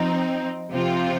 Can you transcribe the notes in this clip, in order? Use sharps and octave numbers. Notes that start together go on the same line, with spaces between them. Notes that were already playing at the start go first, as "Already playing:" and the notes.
Already playing: F3 C4 D#4
C3 F3 C4 F4